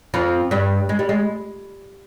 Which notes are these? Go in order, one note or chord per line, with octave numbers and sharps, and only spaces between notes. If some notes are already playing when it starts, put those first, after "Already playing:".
F2 F3
G2 G3
G#3
G3
G#3